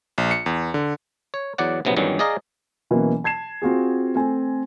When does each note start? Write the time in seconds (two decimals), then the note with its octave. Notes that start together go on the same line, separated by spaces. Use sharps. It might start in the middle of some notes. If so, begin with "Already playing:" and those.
0.18 A#1
0.31 C#7
0.46 E2
0.74 D3
1.34 C#5
1.58 E2 F#3 D5 F#5
1.85 A#1 C3 F#3 B3
1.96 E2 G2 D#3 F#3 G3 C#4
2.19 G#4 D5 D#5 F5 A#5
2.91 B2 E3 F#3 A#3 C#4
3.24 A5 G#6 C7 E7
3.62 C4 F4 F#4 G#4
4.15 A3 C4 G#5